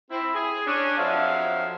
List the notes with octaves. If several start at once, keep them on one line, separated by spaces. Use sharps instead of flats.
C4 E4
G#4
C#4 D4
F2 F3 F#3 G#3 E5 F5